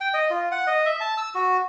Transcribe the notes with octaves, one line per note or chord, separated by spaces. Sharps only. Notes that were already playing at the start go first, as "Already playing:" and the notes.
G5
D#5
F4
F#5
D#5
E5
A5
E6
F#4